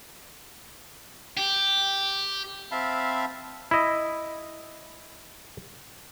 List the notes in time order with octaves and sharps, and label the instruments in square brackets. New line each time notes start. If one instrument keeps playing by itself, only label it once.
[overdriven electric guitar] G4
[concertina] C4 E5 F5 A5 B5
[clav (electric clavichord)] E4 D#5